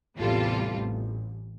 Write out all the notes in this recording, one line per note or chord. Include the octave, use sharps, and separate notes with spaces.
A1 E2 C3 G3 F4 A4
A1